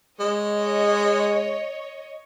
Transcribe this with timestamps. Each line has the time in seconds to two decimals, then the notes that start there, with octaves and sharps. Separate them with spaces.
0.19 G#3 C#5 D#5